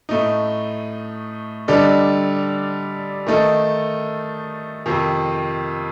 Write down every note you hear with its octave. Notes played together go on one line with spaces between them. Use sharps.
A2 A3 D#4
D3 G3 D4 A4 D#5
D#3 A3 D#4 A4
F2 C3 D#3